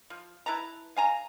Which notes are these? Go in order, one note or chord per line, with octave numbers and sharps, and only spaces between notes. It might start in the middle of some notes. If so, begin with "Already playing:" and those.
F3
E4 B4 A5 A#5
F5 G#5 A#5